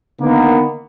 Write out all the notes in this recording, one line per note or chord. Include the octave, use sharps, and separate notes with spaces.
D3 D#3 A#3 B3